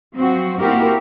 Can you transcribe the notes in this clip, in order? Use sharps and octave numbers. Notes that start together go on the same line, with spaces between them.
F3 F#3 C4 F#4
A#3 C4 E4 F#4 G4 A#4